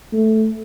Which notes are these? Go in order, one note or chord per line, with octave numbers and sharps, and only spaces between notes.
A3